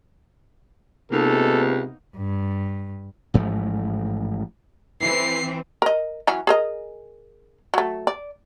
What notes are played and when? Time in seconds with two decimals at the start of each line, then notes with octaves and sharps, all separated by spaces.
1.12 C#2 C3 A#3 B3 D#4 A4
2.17 G2
3.34 A1 G#2 F3 A3
5.02 E3 C4 C7
5.82 A#4 D#5
6.27 E3 F#3 C#4
6.47 G#4 A#4 D#5
7.74 F#3 A3
8.07 D5